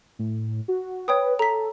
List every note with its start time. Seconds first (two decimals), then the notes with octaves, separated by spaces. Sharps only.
0.19 A2
0.68 F#4
1.08 B4 C#5 G5 D#6
1.39 A4 A#5 B6